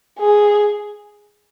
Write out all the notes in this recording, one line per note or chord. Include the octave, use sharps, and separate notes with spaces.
G#4